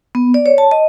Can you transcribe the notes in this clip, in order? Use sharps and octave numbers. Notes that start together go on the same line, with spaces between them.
B3
D5
C#5
A5
D#5